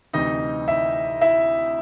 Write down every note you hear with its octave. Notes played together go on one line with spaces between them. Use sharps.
D2 C3 E3 D#4 D#5
E4 E5
E4 E5